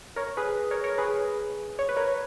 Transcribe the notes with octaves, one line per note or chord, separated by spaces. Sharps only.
A#4 C#5
G#4 B4
A#4 C#5
A#4 C#5
G#4 B4
C#5
B4
A#4 C#5